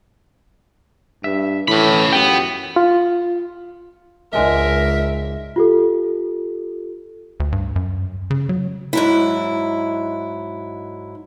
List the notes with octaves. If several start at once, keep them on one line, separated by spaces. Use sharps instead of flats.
G2 E5
A2 E3 C#4 B5
F#2 B3 F4 G4 G5
F4
C#2 G#2 G#3 D4 A#4 E5
F4 G4 A4
D2
G2
F#2
C#3
F#3
G#2 F#3 E4